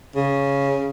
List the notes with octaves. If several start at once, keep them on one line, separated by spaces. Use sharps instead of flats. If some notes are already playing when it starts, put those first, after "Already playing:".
C#3